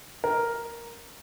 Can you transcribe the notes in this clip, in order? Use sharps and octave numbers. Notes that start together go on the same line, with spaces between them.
A#4